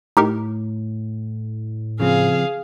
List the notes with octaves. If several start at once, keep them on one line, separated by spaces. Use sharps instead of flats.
A2 D#4 G4 A#4
C#3 F3 C4 G#4 F5